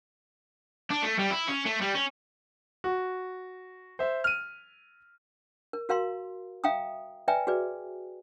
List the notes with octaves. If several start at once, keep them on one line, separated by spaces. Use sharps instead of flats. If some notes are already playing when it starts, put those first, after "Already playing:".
D4
A3
G3
E4
C#4
A3
G3
C#4
F#4
C5 E5
F6 D#7
A#4
F#4 A#4 F5 A#5 C6
E5 F5 G5 A#5 D#6
B4 D5 E5 G5 G#5 A#5
F#4 G#4 B4 D5